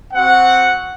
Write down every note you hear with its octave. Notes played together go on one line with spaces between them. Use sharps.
C4 F#5
F#4